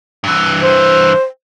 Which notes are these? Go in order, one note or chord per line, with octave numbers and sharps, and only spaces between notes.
G2 E3
C5